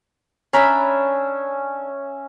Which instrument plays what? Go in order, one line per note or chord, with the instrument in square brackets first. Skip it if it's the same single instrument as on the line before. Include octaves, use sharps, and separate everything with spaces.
[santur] C#4 E5 [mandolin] D4 A#5 B5